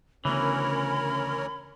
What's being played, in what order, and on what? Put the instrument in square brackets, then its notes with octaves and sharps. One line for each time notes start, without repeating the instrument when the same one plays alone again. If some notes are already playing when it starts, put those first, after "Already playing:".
[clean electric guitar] D2 E3 [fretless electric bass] C#3 B3 [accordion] C#4 A#4 C#5 [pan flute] B5